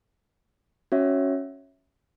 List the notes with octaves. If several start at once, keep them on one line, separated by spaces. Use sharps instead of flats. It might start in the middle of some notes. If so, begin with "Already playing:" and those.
C#4 F#4 C#5 E5